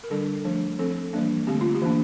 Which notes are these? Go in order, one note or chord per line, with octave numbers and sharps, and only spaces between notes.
A#4
D3 G3 D4 A4
F3 A3 D4
F3 C4 A4
E3 G3 A#3 D4
D3 A3 C4 G4
F4
G4
E3 A#3 D4